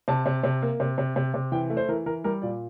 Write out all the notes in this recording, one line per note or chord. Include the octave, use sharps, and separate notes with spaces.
C3 A5
C3
C3
A#3
C3
C3
C3
C3
E3 G5
A3
C5
E3 A#4
E3 A#4
G3 A#4
A#2 D5